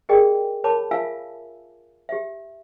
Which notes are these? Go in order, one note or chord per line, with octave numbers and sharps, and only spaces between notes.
G4 G#4 A#4 D5 D#5 G5
A#4 C#5 A5 B5 D6
F4 E5 F5 G#5 E6
G4 E5